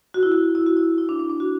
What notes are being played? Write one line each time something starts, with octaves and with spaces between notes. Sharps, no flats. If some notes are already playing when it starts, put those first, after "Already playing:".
F#4
E4
F#4
E4
F#4
E4
E4
D4
D4
D4
F#4